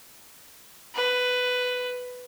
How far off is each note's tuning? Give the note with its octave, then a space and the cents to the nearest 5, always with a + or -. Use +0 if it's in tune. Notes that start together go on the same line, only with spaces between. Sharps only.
B4 +10